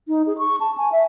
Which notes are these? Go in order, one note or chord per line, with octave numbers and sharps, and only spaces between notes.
D#4
G#4
C#6
A5
G#5
E5